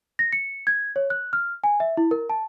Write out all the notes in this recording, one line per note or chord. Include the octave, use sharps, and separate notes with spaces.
A#6
C#7
G#6
C#5
F#6
F6
G#5
E5
E4
A#4
A5